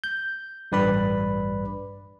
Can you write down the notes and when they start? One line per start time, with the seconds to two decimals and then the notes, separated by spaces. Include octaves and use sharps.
0.04 G6
0.72 A1 G2 B4 D5 B5